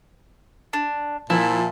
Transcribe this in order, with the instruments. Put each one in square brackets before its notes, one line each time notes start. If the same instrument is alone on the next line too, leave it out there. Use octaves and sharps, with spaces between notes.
[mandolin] D4
[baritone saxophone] A#2 [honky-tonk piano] F3 [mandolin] E4